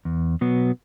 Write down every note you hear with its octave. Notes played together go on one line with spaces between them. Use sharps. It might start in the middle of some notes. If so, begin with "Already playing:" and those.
E2
B2 F#3 B3